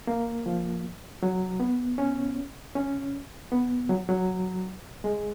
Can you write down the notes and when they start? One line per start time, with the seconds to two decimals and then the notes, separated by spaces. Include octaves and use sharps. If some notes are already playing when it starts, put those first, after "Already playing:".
0.07 A#3
0.46 F3
1.23 F#3
1.60 B3
1.98 C#4
2.75 C#4
3.52 B3
3.89 F#3
4.09 F#3
5.04 G#3